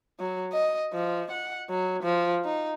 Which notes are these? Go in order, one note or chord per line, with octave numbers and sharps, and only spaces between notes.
F#3
D#5
F3
F#5
F#3
F3
D#4